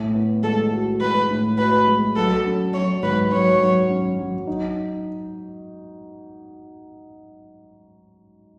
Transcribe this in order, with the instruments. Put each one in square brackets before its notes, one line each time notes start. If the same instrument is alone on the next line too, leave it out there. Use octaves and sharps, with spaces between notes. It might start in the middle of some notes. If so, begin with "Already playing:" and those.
Already playing: [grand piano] A2
B3
[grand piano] G#3 [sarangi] A4
[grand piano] F#4
[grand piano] G#3 [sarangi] B4
[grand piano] A2
[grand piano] F#4 [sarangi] B4
[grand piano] G#3
[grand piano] F#3 [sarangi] A4
[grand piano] C#4
[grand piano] F#3 [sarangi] C#5
[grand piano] G#2 [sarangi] B4
[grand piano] F#3 [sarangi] C#5
[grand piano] F#3
C#4
F#3
D#4